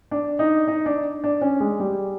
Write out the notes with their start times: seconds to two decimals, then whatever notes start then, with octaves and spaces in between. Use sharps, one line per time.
0.11 D4
0.39 D#4
0.68 D#4
0.86 D4
1.24 D4
1.42 C#4
1.60 G#3
1.80 G3